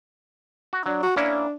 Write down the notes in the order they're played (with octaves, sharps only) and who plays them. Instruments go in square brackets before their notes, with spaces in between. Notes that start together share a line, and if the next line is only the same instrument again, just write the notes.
[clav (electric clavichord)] F#4
[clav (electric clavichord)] F#3 [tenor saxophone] D4
[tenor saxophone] F#4
[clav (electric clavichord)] A#3 C#4 E4 [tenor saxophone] D4